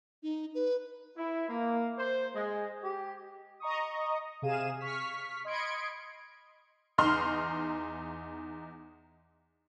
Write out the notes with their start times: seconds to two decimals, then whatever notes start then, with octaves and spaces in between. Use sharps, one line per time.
0.23 D#4
0.55 B4
1.17 E4
1.48 A#3
1.98 C5
2.34 G#3
2.83 G4
3.60 D#5 A#5 C#6 D#6
4.42 C3 G#4 F5 D#7 E7
4.80 C#6 F6 B6
5.45 D#5 B5 C6 G#6 C#7 D7
6.98 E2 D#4 C6 F6